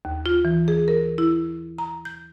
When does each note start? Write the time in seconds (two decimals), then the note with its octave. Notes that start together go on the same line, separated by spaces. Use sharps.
0.05 D#2
0.26 F4
0.45 E3
0.68 G#4
0.88 A#4
1.18 E4
1.78 A#5
2.05 G6